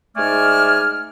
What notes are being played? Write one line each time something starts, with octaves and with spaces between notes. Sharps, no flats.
G#2 A3 D5 G#5 F6